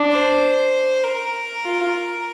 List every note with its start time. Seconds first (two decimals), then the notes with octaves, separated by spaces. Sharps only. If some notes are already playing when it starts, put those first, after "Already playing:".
Already playing: D4
0.12 C5
1.04 A#4
1.64 F4